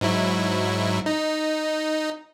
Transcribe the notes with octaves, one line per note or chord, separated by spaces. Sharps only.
G#2 F#3 E4
D#4